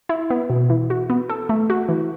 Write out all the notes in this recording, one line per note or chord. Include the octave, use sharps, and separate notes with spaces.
E4
B3
B2
E3
F#4
B3
A4
A3
F#4
E3